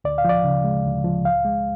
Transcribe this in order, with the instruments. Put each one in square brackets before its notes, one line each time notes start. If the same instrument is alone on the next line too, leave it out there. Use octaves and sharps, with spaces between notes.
[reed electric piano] D2 D5
F5
F3 D5
C#3
G#3
D2
F3
C#2 F5
G#3